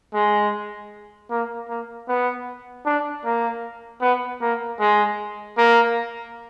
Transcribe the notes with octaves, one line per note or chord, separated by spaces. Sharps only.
G#3
A#3
A#3
B3
D4
A#3
B3
A#3
G#3
A#3